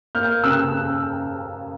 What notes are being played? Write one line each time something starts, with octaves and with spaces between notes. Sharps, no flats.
A#3 F6 G6
C#3 E6 F#6